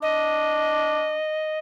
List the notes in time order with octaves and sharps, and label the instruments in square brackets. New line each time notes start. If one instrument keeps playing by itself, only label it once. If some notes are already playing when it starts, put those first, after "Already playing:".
[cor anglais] D4 [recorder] D#5